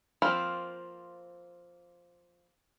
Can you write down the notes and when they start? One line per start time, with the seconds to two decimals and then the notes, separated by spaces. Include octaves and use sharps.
0.22 F3 A#3 C4 F4 B5